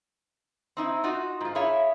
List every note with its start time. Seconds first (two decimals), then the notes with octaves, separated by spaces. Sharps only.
0.77 C4 D#4 E4
1.04 D#4 F4 F#4
1.41 G#2 F4
1.55 E4 G#4 C#5 E5 F5